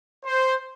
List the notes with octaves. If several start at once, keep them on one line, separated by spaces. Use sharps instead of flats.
C5